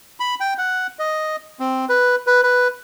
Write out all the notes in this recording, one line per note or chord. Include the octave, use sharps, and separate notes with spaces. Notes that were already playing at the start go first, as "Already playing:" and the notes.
B5
G5
F#5
D#5
C4
B4
B4
B4